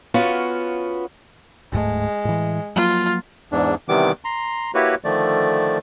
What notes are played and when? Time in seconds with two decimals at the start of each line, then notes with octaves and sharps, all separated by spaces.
0.14 B3 C#4 F4 F#4
1.72 D1 G#2 G#3 A3
2.25 A2 E3
2.76 F3 F#3 A#3 F4
3.52 E2 G#2 D4
3.89 C3 D#3 E3 G3 B3 D6
4.25 A#5 C6
4.75 A#3 E4 F#4 G4 B4 C#5
5.05 D3 D#3 F3 A3 D5